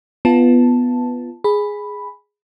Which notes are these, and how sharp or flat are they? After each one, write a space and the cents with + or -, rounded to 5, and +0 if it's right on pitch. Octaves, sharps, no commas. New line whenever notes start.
B3 +0 F4 -20 A5 +0
G#4 +0 B5 +0